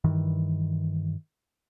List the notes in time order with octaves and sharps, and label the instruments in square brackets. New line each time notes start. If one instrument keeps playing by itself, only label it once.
[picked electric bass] G2 D#3 E3